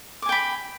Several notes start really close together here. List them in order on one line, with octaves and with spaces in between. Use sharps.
D6 G#5 G5 B5